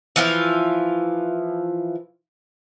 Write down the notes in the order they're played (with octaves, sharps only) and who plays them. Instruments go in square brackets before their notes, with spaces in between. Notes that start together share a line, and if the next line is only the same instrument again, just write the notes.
[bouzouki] E3 F3 F4